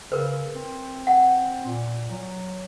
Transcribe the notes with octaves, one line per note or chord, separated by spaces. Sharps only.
C#3 A#4 B4
C4
F#5
A#2
F#3